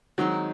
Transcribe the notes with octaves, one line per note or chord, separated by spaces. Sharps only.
D#3 F#3 G#3 C4 D#4